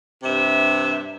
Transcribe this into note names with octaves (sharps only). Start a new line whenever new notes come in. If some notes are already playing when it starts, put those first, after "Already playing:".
G2 C3 E5